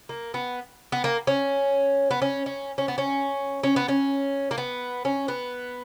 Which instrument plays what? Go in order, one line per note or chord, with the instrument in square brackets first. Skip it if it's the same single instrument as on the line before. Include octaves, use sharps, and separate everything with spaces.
[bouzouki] A#3
B3
B3
A#3
C#4
B3
C#4
C#4
C#4
B3
C#4
C#4
B3
C#4
A#3
B3
C#4
B3